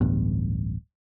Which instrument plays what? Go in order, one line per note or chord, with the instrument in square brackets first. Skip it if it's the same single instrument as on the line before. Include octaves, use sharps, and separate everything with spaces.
[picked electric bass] D1 A1 G2 B3